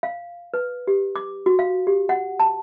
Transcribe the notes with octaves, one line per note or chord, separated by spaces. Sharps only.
F5
B4
G4
D6
F#4
F5
G4
F#5
A5